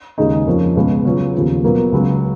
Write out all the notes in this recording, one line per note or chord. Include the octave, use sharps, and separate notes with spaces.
D#2 C#3 G#3 D#4
F2 F3 A#3 C#4
C#2 B2 G#3
C#3 F#3 C#4 F4 B4
D#2 C#3 F3 B3 F4
B2 F#3 A#3 F4 B4
C#2 C#3 F#3